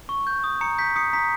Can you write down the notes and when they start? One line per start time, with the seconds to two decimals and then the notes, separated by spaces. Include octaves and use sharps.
0.09 C#6
0.27 G6
0.44 D#6
0.61 A#5 C#7
0.78 G6 B6
0.96 D#6 C#7
1.13 A#5 B6